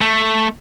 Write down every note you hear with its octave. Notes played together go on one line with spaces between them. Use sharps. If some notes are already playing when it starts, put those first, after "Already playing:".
A3